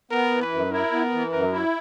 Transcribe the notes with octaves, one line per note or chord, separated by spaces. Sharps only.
B3 A#4
E3
B4
F#2
E4 A#4
B3
E3
F#2 A#4
E4